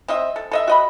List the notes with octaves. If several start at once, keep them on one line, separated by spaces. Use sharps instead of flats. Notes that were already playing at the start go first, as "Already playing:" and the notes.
C4 D#5 E5
A4
A4 D#5 E5
F#4 D#5 B5